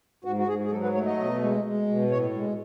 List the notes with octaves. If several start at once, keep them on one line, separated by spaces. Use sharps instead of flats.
G#2 F#4
F#4
G#2 G#4
G#4
F#3 A4
B4
A3 C#5
D#5
B2
G#3
G#3
B2
A2 C#5
G#3